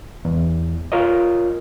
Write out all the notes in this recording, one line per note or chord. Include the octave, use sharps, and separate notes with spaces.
E2
F4 A#4 C#5 D#5